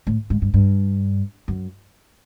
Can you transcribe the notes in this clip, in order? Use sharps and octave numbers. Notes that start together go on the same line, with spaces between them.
A2
G#2
G2
G2
F#2